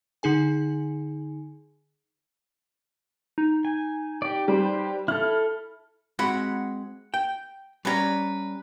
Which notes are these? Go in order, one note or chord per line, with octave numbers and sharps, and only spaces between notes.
D3 D#4 G#4 G#5
D#4
G#5
G4 D5
G3 G4 B4 C5
E4 A4 F6
G#3 C4 F#4 F#5 B5
G5
G3 C#4 B4 D5 A#5